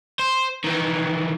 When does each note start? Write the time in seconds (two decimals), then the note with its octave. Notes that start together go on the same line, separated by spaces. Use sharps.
0.19 C5
0.64 D#3 E3